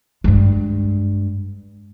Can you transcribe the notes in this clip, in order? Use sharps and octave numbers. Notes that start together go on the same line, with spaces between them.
G2 G#3